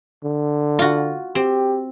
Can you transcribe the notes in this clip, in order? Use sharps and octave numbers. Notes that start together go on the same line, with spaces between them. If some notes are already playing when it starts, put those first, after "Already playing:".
D3
F4 F#4
C4 G4